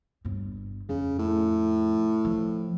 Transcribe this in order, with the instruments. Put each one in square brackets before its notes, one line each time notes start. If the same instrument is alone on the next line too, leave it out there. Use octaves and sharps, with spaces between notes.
[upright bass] G1 G2
[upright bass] F2 [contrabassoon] C#3
[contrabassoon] A2
[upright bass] F3